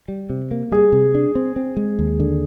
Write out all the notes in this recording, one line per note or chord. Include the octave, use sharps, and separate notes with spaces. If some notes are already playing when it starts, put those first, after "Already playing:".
G3
C3
A#3
G3 G#4
C3
D4
C4
C4
G#3
D#2
D3